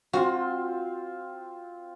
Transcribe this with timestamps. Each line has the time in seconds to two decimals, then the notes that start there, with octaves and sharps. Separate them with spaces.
0.13 C4 F4 F#4 C6